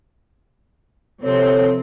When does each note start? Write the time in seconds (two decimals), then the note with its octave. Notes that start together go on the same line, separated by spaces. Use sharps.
1.23 C3 F3 C4 A4 C#5